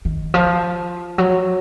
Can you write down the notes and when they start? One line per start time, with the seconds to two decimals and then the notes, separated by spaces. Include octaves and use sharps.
0.05 D#3
0.34 F3
1.18 F#3